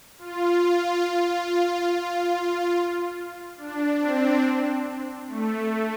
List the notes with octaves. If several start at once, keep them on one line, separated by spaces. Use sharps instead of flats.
F4
F4
F4
D4
C4
A3